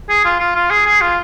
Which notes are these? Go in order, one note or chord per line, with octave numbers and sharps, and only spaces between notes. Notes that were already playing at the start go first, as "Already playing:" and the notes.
G#4
F4
F4
F4
G#4
G#4
F4